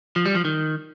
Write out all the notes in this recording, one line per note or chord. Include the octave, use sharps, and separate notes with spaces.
F3
G3
F3
D#3